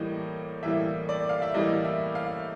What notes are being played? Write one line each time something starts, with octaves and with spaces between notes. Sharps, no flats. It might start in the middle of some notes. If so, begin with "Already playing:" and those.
Already playing: A2 E3 G3 A#3 D#5
A2 E3 G3 A#3 E5
D5
F5
E5
A2 E3 G3 A#3 D#5
E5
F5